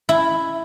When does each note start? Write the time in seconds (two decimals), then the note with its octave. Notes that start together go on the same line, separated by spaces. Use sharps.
0.09 E4